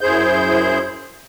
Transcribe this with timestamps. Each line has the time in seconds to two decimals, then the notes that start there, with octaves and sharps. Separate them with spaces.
0.01 F#2 E4 G#4 C5 G6